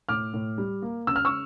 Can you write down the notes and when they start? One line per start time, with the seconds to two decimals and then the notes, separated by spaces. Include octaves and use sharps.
0.09 A2 D6 F6
0.34 A2
0.58 G3
0.82 A#3
1.07 C#3 E6
1.16 F6
1.25 C#6 E6